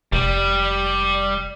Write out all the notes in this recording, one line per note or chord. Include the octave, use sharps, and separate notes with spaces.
F1 G3